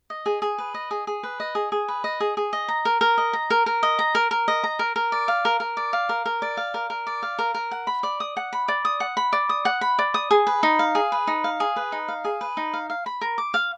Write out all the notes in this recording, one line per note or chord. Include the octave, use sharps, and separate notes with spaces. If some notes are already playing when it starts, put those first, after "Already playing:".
D#5
G#4
G#4
B4
D#5
G#4
G#4
B4
D#5
G#4
G#4
B4
D#5
G#4
G#4
D#5
A#5
A#4
A#4
D#5
A#5
A#4
A#4
D#5
A#5
A#4
A#4
D#5
A#5
A#4
A#4
D5
F5
A#4
A#4
D5
F5
A#4
A#4
D5
F5
A#4
A#4
D5
F5
A#4
A#4
F#5
B5
D5
D#6
F#5
B5
D5
D#6
F#5
B5
D5
D#6
F#5
B5
D5
D#6
G#4
B4
D#4
F5
G#4
B4
D#4
F5
G#4
B4
D#4
F5
G#4
B4
D#4
F5
F5
B5
A#4
D6
F5